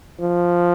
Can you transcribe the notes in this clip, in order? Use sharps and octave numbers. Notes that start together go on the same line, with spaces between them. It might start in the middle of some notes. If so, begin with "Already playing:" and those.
F3